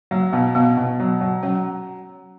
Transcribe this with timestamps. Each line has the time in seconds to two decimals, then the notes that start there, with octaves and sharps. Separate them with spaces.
0.11 F#3 A#3
0.33 B2 B3
0.55 B2 B3
0.77 B2
1.00 F#3
1.21 F#3
1.43 F#3 C#4